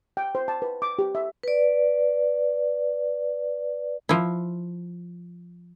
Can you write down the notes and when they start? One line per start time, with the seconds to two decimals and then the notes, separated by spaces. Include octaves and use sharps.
0.17 G5
0.35 C5
0.48 A5
0.62 B4
0.82 D6
0.99 G4
1.15 E5
1.43 B4 D5
4.09 F3 E4